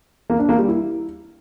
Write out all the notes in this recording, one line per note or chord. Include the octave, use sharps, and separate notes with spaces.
A#3
D4
A#3
G3
E4